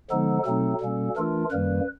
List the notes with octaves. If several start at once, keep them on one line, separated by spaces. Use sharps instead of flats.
D3 F3 G#3 B3 D#4 A4
B2 F#3 A3 C4 D#4 A4
B2 G3 A#3 C#4
E3 A3 D4 F4 A#4
F#2 D#3 G3 A#3 B4